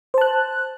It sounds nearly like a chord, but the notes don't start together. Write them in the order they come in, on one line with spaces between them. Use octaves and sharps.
C5 A5 F#6